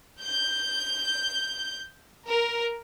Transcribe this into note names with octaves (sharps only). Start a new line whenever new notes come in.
G6
A#4